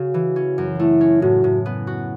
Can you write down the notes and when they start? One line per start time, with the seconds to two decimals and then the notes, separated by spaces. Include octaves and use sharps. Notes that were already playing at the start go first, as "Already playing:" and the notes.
Already playing: C#3 F#4
0.14 E3
0.36 C#4
0.58 F#2
0.79 A3 E4
1.01 C#4
1.22 A2 F#4
1.44 A2
1.66 B3
1.87 F#4